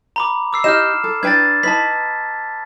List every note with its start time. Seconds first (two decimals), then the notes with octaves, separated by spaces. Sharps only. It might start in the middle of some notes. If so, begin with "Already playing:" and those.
0.16 A#5 B5 D6
0.53 D6 E6 C7
0.64 D#4 G4 D#5 F6 E7
1.04 A4
1.23 D4 B4 G5 G#6 A6
1.63 D#4 B4 A5 B6